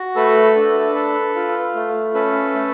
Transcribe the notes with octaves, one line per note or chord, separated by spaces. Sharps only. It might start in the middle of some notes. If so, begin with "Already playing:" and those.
Already playing: F#4
A3 A4 B4
D4
A4
F4
A3
C#4 A4 B4
A3